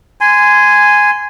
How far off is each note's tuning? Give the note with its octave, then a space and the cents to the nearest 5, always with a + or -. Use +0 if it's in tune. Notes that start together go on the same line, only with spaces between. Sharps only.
G#5 +0 C6 -25